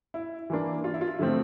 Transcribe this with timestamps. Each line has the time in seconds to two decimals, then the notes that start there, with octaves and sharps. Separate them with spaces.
0.14 E4
0.50 E3 A#3 D4
0.84 F4
0.94 E4
1.01 F4
1.19 D3 F3 A3 C4 E4